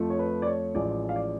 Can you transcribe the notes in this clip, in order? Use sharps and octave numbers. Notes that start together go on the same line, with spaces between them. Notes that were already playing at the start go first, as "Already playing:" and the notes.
Already playing: F2 F3 A3
C#5
B4
D5
C#5
A1 A2 F3 G#3 D5
F5
D5